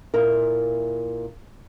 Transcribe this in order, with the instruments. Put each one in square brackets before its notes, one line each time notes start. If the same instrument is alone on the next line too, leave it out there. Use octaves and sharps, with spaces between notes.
[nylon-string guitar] A#2 E4 A#4